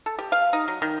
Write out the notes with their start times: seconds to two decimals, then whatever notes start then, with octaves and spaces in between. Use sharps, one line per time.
0.06 A4
0.19 G4
0.32 F5
0.53 D#4
0.68 F#3
0.82 D#3